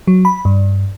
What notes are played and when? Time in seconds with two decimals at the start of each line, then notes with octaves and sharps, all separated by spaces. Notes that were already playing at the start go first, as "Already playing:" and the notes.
0.07 F#3
0.25 B5
0.45 G2